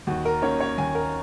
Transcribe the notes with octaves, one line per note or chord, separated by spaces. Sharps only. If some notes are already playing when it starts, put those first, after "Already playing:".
D#2 F#4
A#4
D#3 A#3 C#4 C#5
C#5
D#2 G#5
A#4